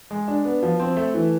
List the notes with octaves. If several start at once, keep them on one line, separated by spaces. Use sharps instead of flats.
G#3
D4
B3
F3
C4
A3
E3